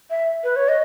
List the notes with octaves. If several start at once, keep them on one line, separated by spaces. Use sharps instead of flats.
E5
B4
C#5
D#5